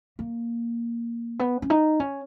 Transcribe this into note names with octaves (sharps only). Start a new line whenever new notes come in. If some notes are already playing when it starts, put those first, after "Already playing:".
A#3
B3
C#4
D#4
C#4